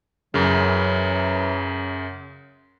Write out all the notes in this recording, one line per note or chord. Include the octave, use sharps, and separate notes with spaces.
F#2 C#3 E3 F#3